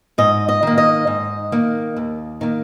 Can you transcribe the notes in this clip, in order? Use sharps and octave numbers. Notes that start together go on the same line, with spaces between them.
G#2 D#5
D#5
D#3 A#3
D#5
G#2
D#3 A#3
D#2
D#3 A#3